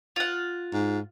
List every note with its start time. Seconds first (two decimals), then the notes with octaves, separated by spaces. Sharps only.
0.16 F4 F#5
0.73 G#2